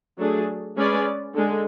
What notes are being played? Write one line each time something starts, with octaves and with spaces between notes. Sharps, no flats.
F#3 A3 D4 G#4
G#3 C#4 G#4 B4 D5
D3 G#3